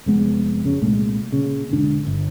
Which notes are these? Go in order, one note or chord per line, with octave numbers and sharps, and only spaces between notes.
F1 G#3 B3
F#2 C#3
C2 A#2 G#3 A3
A#2 C#3
E1 G#2 D3 D4
G1